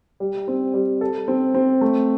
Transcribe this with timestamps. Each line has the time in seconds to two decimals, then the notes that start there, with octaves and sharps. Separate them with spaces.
0.20 G3
0.48 C4
0.74 G3
1.01 A4
1.28 C4
1.54 C4
1.81 A3